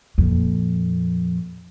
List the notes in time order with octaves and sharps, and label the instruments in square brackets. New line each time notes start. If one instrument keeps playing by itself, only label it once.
[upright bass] F2 A#2